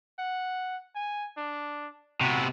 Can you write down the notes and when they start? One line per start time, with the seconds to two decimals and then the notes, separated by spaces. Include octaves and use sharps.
0.19 F#5
0.95 G#5
1.37 D4
2.21 C3 B3 F#4